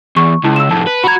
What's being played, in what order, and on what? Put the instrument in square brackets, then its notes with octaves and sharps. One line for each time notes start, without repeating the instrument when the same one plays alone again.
[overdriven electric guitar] E2 [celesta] C#6
[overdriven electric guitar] C#2 [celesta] E4 A5
[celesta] E6 E7
[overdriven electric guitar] F2 A2 [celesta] A5
[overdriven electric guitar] B4
[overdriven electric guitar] F#4 A#5 [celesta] B5 G#6